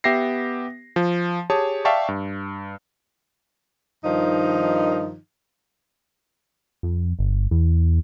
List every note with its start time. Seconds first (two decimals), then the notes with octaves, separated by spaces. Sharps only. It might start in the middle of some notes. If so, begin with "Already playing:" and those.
0.04 B3 G4 E5 G5 A#6 C7
0.96 F3
1.50 G4 G#4 C#5 A5 D#6
1.85 D5 E5 F5 G5 A5 C#6
2.08 G2
4.04 G2 D#3 F3 D#4
6.83 F2
7.19 G1
7.51 E2